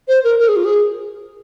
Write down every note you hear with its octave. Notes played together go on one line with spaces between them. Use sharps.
C5
A#4
A#4
G#4
F4
G#4